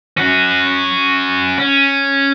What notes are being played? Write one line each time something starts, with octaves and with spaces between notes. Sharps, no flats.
C#4 F#4
C#4